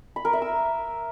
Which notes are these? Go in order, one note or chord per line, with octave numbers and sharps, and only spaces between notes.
B5
A#4
E5
E6